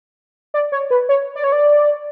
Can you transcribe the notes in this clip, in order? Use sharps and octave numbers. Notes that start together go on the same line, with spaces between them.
D5
C#5
B4
C#5
D5
C#5
D5